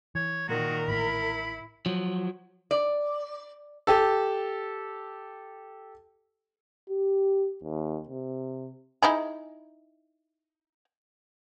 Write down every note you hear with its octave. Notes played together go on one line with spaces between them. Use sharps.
E3 C#5
A#2 D#3 F#4 A#4
A1 A2 E4 B5
F3 F#3
D5
G4 A4
G4
D#2
C3
D#4 E4 G#4